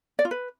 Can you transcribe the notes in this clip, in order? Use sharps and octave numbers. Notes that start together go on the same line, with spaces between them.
D5
F4
B4